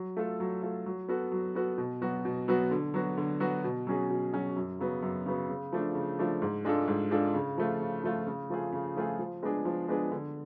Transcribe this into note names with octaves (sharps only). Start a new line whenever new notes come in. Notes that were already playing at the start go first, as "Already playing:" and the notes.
Already playing: F#3
A3 F4 A4
F#3
A3 F4 A4
F#3
B3 F#4 A4
F#3
B3 F#4 A4
B2
F#3 B3 F#4
B2
F#3 B3 F#4
D3
F#3 B3 F#4
D3
F#3 B3 F#4
B2
F#3 C#4 G#4
B2
F#3 C#4 G#4
F#2
C#3 F#3 B3
F#2
C#3 F#3 B3
C#3
F3 A3 D4
C#3
F3 A3 D4
G#2
G#3 D4 F4 A4
G#2
G#3 D4 F4 A4
C#3
F3 A3 F4
C#3
F3 A3 F4
C#3
F3 A3 F4 G#4
C#3
F3 A3 F4 G#4
F3
G#3 B3 D4 G#4
F3
G#3 B3 D4 G#4
D3